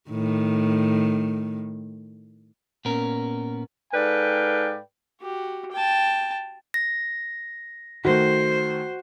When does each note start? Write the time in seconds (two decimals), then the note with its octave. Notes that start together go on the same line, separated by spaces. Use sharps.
0.10 A2 D#3
2.85 A#2 B3 C#4 A#4
3.94 G#2 A4 B4 D5 F5 G5
5.21 F#4 G4
5.71 G5 A5
6.74 A#6
8.05 D#3 A3 F#4 C5